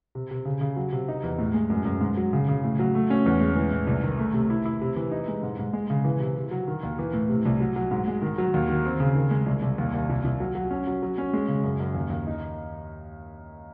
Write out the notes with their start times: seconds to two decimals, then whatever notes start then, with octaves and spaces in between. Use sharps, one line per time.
0.15 C3
0.31 C3
0.45 C#3
0.61 C#3
0.76 F#3
0.92 C3
1.08 D#4
1.23 E2
1.39 A2
1.54 G#3
1.70 F#2
1.85 F#2
2.01 G#2
2.17 F#3
2.33 C#3
2.48 C#3
2.63 A2
2.79 F#3
2.95 A3
3.10 C#4
3.26 E2
3.40 G#3
3.56 E3
3.71 A2
3.87 C2
4.03 D#3
4.19 A3
4.34 C3
4.50 E4
4.65 E4
4.81 C3
4.96 E3
5.11 D#4
5.28 G#3
5.43 G#2
5.59 G#2
5.73 G#3
5.90 C#3
6.04 E3
6.20 C3
6.36 C3
6.51 F#3
6.68 D#3
6.83 D#2
6.99 E3
7.13 A2
7.29 C3
7.45 C2
7.60 F#3
7.76 F#3
7.91 G#2
8.08 G#3
8.22 D#3
8.38 F#3
8.54 D#2
8.69 D#3
8.85 C4
9.00 C#3
9.15 D#3
9.31 G#3
9.46 C2
9.62 C2
9.78 D#2
9.94 D#2
10.09 C2
10.25 C2
10.40 F#3
10.55 F#3
10.71 C#4
10.87 F#3
11.03 F#3
11.18 C#4
11.33 G#3
11.48 C#3
11.64 F#2
11.80 F#2
11.95 D#2
12.10 D#2
12.27 D#4